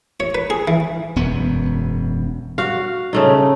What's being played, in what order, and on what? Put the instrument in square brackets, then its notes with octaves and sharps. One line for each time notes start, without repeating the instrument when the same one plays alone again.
[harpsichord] C#5
B4
G#4
E3
[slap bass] E1 F#2 B3
[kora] F#4 F5
C#3 A3 D#4